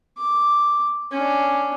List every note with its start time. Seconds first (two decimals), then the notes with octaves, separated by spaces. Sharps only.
0.18 D6
1.12 C#4 D4